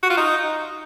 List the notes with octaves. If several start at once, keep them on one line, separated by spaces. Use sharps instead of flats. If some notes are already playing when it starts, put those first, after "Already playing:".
F#4
F4
D#4